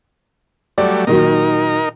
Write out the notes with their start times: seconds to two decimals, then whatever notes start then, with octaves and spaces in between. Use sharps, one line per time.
0.78 F#3 G3 A3 D5
1.07 A#2 D#3 F#3 D#4 A#4